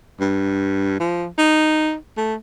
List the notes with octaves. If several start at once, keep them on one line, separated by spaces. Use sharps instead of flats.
G2
F3
D#4
A3